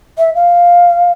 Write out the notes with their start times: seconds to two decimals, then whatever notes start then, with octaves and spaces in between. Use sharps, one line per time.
0.18 E5
0.35 F5